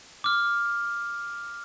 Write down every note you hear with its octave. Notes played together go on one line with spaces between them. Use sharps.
D6 F6